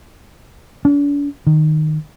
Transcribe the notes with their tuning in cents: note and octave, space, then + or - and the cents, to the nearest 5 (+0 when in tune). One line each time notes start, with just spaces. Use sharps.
D4 -45
D#3 -10